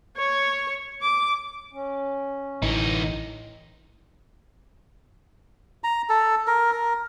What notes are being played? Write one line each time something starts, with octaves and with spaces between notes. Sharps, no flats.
C#5 C#6
D6
C#4
A1 E3 D#4
A#5
A4
A#4
A#4